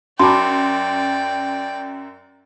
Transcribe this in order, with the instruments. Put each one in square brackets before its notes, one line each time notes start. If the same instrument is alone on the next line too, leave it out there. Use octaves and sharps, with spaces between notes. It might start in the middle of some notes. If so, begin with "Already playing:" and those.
[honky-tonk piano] F#2 [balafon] F#4 A5 B5 [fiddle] D5 G5 [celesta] C6 D6